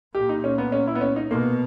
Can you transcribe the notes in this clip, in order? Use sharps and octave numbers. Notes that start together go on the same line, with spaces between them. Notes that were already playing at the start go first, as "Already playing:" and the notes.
A#2 G4
D#4
C#4
B3
C#4
E4
B3
C#4
D#4
B2 A#3